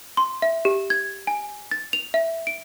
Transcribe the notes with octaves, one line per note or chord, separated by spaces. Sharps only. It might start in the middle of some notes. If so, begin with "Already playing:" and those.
C6
E5
G4
G#6
G#5
A6
F7
E5
D7